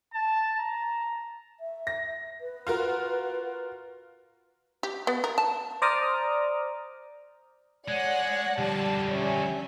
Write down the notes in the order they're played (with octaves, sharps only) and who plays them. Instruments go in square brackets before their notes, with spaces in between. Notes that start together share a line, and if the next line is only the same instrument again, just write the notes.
[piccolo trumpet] A5
A#5
[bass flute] E5
[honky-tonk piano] A#6
[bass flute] B4
[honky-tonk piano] F4 F#4 A#4
[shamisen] G4
B3
A#4
A5
[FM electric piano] C5 D5 A#5 D6 D#6 F6
[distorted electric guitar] G#3 [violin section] C#5 D5 F#5
[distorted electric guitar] D3 F3 [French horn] G3 [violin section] A5
[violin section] C#4 E5